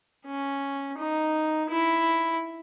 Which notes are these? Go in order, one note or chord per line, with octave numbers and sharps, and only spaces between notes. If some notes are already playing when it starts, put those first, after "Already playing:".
C#4
D#4
E4